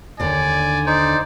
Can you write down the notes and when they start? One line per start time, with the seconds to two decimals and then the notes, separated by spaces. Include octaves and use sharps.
0.20 D#2 D3 D5 G#5
0.86 D#4 C5 D5